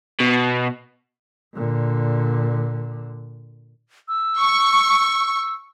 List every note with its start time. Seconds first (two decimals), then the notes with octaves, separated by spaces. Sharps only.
0.20 B2
1.55 A#2 D3
4.08 E6
4.38 C#6